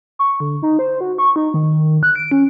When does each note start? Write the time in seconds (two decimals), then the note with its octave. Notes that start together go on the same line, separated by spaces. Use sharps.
0.19 C#6
0.40 D3
0.63 D#4
0.79 C5
1.01 F#4
1.18 C#6
1.36 D#4
1.54 D#3
2.03 F#6
2.16 D7
2.31 C#4